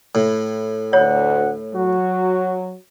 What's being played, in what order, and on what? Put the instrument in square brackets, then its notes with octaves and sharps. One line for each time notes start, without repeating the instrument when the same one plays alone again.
[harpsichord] A2
[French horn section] D2 [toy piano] C#5 [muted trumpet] F#5
[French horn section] F#3 [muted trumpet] F#4